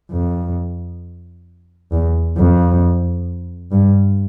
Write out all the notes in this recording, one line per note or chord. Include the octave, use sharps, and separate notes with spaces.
F2
E2
F2
G2